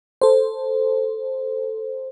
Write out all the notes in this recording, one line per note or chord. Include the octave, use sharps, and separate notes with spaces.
A4 C5